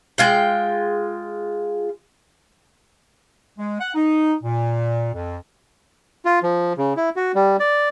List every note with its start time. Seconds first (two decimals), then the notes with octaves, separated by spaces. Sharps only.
0.18 G#3 F4 G5
3.59 G#3
3.80 F#5
3.95 D#4
4.44 A#2
5.14 F2
6.25 F4
6.43 F3
6.78 C#3
6.97 E4
7.16 F#4
7.35 G3
7.60 D5